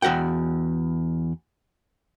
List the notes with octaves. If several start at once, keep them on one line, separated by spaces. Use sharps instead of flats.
E2 F#4 F#5 G5